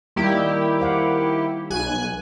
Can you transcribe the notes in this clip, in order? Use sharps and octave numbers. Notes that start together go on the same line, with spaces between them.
D#3 G3 A#3 E4 G4
C5 F5 F#5
B1 G#5 F#6